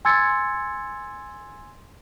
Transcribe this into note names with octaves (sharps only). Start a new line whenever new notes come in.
G#5 C6 E6 G#6 A6 C#7